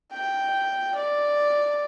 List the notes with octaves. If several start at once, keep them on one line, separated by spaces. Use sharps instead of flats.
G5
D5